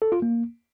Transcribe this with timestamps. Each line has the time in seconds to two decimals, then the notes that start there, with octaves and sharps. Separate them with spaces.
0.02 A4
0.12 F4
0.22 A#3